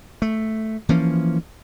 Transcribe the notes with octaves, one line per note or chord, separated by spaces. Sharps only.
A3
E3 F3 A#3 C#4